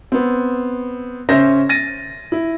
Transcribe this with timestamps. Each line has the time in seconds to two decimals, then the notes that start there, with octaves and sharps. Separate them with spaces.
0.12 B3 C4
1.29 C#3 C#4 C5 E5 A#6
1.69 A6 A#6 D#7
2.32 E4